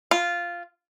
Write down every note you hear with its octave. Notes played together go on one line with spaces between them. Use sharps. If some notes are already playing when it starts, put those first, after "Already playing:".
F4